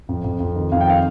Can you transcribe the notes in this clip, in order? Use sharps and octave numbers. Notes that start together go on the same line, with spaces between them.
F2
F2
F2
D#3
F2 F5
G5
D#3 F5